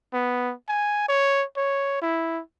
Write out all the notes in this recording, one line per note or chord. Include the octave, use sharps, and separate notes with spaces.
B3
G#5
C#5
C#5
E4